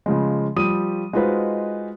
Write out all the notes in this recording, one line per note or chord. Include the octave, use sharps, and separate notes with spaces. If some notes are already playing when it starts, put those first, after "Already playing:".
C#3 F3 G#3
F3 G3 D#6 D#7
G#3 D#4 F4 F#4 B4 C5